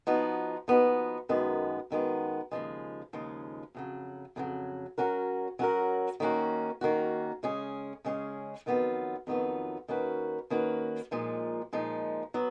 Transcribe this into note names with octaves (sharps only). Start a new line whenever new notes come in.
F3 B3 D#4 F#4
F3 B3 D#4 F#4
F#2 D#3 G#3 B3
F#2 D#3 G#3 B3
D#2 C#3 F3 G#3
D#2 C#3 F3 G#3
F2 C#3 F#3
F2 C#3 F#3
F#3 C#4 F#4 A#4
F#3 C#4 F#4 A#4
D#3 A#3 C#4 F#4
D#3 A#3 C#4 F#4
C#3 G#3 C#4 G#4
C#3 G#3 C#4 G#4
F2 D#3 F#3 B3 F4
F2 D#3 F#3 B3 F4
D#3 A#3 C#4 F#4 B4
D#3 A#3 C#4 F#4 B4
A#2 F3 G#3 D#4
A#2 F3 G#3 D#4
F#3 B3